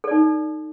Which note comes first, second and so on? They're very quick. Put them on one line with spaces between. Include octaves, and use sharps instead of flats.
A4 D5 D#4